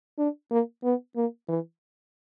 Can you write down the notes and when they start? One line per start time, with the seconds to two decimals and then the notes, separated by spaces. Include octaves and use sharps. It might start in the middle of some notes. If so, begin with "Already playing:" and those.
0.18 D4
0.51 A#3
0.84 B3
1.16 A#3
1.49 E3